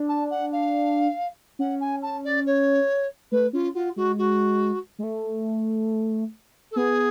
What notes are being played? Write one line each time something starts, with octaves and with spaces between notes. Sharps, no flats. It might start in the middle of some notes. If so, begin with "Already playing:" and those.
Already playing: D4
A5
F#5
F5
C#4 F#5
G#5
A5
D5
C#5
A3 B4
C#4 F4
F4 F#4
G#3 F#4
F#4
G#3
A3
A4
B3 G#4